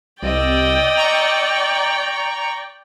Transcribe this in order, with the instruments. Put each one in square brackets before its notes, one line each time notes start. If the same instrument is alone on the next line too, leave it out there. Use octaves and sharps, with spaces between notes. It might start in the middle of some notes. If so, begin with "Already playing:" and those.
[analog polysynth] C2 [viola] D5 G5 [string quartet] D#5 E6
[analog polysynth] A#5 C#6